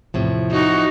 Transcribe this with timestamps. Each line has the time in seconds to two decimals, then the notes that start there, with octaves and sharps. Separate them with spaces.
0.14 A1 E2 A2 C3 F3
0.51 D#4 F#4